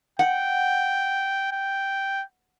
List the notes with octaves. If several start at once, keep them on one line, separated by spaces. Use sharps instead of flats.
F#5 G5
G5